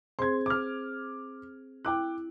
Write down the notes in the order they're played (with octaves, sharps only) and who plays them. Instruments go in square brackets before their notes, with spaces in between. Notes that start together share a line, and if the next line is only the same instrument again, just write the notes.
[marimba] C4 G#4 C5 [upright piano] C6 G#6
[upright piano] D6 F6
[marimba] E4 [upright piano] G5 D6 F#6